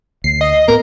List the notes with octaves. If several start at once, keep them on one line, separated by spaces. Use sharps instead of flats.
D2 C7
D#5
A2 A3 B3 A#4